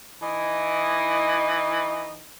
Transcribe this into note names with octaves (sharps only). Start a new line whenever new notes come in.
E3 D#4 E4 D#5